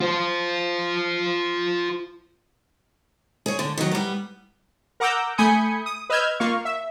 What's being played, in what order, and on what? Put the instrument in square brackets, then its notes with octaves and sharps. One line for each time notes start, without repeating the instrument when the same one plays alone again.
[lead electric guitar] F4 C5
[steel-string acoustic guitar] G#4 C#5
D3
D#3 F#3
G3 B3
[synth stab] A#4 F#5 A#5 D6 E6 G6
A3 G#5 B5 D#6 G6 C#7
D#6
B4 D#5 E6 F6 G6 G#6
A#3 F4 F5 C#6
E5